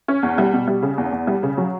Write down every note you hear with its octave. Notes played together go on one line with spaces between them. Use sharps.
C#4
E2
G3
B2
G3
C#3
E2
E2
G3
C#3
F#3